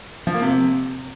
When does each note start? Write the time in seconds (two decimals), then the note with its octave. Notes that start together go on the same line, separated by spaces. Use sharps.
0.27 F3
0.34 A#3
0.42 C3